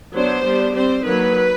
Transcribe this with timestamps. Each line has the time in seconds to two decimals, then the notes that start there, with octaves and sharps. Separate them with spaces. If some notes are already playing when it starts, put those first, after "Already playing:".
0.14 F#3 B3 D4 C5
0.44 G3 B3 D4
0.74 G3 C4 C5
1.04 D#3 F#3 A#3 B4